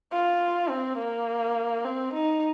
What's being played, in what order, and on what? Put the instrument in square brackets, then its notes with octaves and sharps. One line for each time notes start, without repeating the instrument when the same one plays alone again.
[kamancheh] F4
C4
A#3
C4
D#4